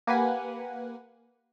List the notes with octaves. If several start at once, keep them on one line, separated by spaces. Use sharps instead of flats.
A#3 G4 B4 F#5 G#5